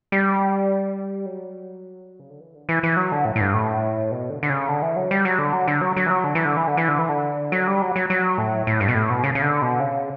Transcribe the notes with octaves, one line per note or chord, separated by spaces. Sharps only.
G3
F#3
C#3
D3
E3
D3
E3
E3
F#3
D3
A2
A2
G2
A2
B2
D3
D3
C#3
D3
E3
F#3
G3
F#3
D3
F#3
D3
F#3
F#3
E3
F#3
D3
E3
D3
E3
D3
E3
D3
E3
D3
F#3
G3
F#3
F#3
F#3
A2
A2
G2
B2
A2
B2
C#3
C#3
D3
B2
C#3